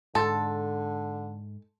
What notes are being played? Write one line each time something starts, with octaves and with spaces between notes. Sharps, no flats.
G#2 D3 A4 A5 C6 A6